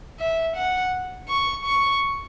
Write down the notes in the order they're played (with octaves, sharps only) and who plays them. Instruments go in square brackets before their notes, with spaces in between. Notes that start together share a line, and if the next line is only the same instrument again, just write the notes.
[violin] E5
F#5
C#6
C#6